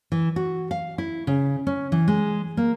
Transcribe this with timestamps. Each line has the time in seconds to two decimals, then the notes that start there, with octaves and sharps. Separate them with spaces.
0.12 E3
0.36 F#4
0.71 F5
0.98 E4
1.27 C#3
1.67 C#4
1.92 E3
2.08 G#3
2.57 A#3